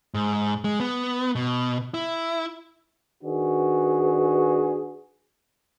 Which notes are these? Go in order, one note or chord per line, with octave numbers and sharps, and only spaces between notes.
G#2
G#3
B3
B2
E4
D#3 D4 F#4 G#4 B4